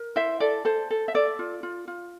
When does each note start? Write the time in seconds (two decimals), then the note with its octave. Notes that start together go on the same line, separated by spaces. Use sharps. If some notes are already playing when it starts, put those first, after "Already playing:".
Already playing: A#4
0.16 E4 C5 E5
0.40 A4 D5
0.65 A4 C5
0.90 A4
1.08 E5
1.14 A4 D5
1.39 F4
1.63 F4
1.88 F4